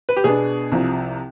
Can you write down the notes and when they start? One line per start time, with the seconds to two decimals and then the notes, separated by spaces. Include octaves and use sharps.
0.09 B4
0.17 G4
0.24 B2 B3 D4 G#4
0.72 C2 C3 F3